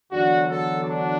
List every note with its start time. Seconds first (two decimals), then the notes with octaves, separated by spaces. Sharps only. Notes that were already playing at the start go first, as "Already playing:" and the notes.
0.11 E2 D3 F#3 D4 F#4
0.47 F#4 A4
0.80 D4 F#4